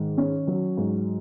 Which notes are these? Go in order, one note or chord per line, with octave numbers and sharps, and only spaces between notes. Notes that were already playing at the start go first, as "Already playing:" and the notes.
Already playing: G#2 D#3
C#4
F#3
G#2